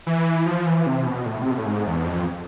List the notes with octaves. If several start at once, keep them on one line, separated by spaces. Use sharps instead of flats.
E3
F3
E3
C3
B2
A2
C3
B2
A2
G#2
E2
F2